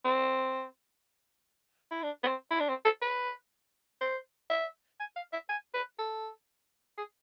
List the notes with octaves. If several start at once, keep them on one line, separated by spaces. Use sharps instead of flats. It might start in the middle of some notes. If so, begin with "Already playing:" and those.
C4
E4
D4
B3
C4
E4
D4
C4
A4
B4
C5
E5
G#5
F5
E5
G#5
B4
A4
G#4